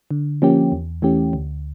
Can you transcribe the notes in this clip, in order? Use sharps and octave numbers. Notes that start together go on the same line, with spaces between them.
D3
F3 A#3 C#4 G4
E2
E3 A3 C#4 G4
D2